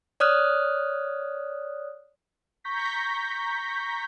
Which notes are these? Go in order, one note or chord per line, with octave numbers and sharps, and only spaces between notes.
C#5 D5 D#6 F6 F#6
A#5 C#6 G6 A#6 B6